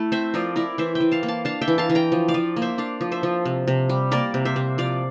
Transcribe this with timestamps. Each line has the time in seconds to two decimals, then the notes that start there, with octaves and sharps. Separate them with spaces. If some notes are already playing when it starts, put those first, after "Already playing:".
Already playing: A3 E4
0.12 C4 C5 E5
0.34 F3 A#4 D5
0.56 E4 A#4 D5
0.78 E3 C5 E5
0.95 E5 G5
1.00 E3
1.11 F5 A5
1.23 A#3
1.28 F5 A5
1.45 D4 F5 A5
1.61 E5 G5
1.68 E3
1.78 F5 A5
1.90 E3
1.95 G5 A#5
2.12 F3
2.28 D5 F5
2.34 F3
2.56 A#3
2.62 C5 E5
2.78 D4 D5 F5
3.01 F3
3.12 C5 E5
3.23 F3
3.45 C3
3.67 C3
3.89 G3
4.11 A#3 A#4 D5
4.34 C3
4.45 C5 E5
4.56 C3
4.78 F3 D5 F5